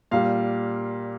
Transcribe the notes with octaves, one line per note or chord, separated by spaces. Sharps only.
A#2 G3 F5